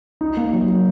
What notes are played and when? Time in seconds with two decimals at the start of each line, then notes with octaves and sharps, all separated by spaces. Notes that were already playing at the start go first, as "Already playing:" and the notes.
0.21 D#4
0.37 A#3
0.53 F#3